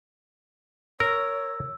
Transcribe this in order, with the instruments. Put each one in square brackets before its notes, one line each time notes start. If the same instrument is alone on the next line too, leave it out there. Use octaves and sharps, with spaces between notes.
[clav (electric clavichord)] A#4 [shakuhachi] C#5 [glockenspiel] E6